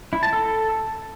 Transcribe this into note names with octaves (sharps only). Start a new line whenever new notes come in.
E4
A5
A4